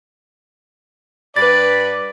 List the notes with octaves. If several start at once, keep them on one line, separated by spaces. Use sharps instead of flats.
G2 B4 D5 B5 A6